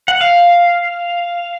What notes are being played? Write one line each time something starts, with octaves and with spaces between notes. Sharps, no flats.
F#5
F5